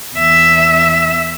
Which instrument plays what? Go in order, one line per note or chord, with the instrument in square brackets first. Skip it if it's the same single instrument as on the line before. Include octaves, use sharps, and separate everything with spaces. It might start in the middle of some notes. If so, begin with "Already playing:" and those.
[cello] E2 E5